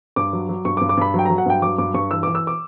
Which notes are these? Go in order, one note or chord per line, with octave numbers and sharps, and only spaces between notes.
G2 D6
F#3
F#3
G2 C#6
D6
G2
D6
G2 B5
F#3 G5
F#3 A#5
F#5
G2 G5
F#3 D6
G2 D6
G2 C#6
E3 E6
E3 D6
E6
D6